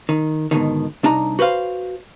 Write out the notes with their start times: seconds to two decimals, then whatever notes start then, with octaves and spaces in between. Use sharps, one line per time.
0.09 D#3
0.51 G#2 B2 D3 D#3
1.03 C2 D4 D#4 A#5
1.39 F#4 B4 C5 F5